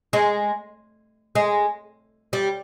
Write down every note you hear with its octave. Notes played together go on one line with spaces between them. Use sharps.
G#3
G#3
G3